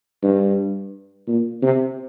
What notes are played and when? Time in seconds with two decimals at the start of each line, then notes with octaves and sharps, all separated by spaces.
0.23 G2
1.28 A#2
1.62 C3